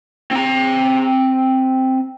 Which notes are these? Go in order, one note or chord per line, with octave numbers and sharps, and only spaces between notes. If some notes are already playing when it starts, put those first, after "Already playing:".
C4 A#5